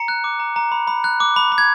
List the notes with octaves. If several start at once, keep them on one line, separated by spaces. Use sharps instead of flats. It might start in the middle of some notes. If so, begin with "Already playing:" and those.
Already playing: A#5 C#7
F#6
D6
A#5
A#5
B5
B5
F#6
D6
B5
B5
G#6